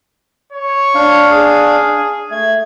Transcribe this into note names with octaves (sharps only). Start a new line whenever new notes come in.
C#5
D4 F5
G#4
A3 G#6